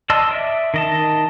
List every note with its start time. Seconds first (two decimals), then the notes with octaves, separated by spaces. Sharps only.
0.10 D5 D#5 A5 C6 E6
0.31 D5 E5
0.74 D#3 D#5 A5